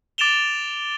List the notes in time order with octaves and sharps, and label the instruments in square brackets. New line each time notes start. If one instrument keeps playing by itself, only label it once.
[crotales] D6 A6 D7 E7 F7 G7